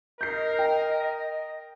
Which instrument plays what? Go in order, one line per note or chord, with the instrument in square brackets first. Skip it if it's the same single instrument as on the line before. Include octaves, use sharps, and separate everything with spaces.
[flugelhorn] A#4 [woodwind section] D#5 [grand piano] G6 C7
[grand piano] G5